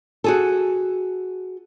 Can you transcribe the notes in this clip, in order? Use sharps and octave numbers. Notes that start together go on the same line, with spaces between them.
F#4 G#4 A4